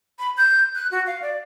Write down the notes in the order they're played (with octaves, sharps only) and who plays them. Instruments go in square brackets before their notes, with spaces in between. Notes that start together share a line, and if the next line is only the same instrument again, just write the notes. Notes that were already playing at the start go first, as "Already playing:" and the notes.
[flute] B5
G6
F#6
F#4
F5
D5